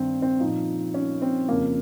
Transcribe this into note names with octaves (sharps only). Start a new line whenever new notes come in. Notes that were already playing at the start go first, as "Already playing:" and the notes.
Already playing: G2 D#3 C4
C4
A#2 F3 D#4
C#4
C4
F2 C#3 F3 A#3